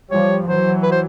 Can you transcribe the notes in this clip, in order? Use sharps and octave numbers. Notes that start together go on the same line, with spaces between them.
F3 G3 C#5
E3 F#3 C5
B4
C5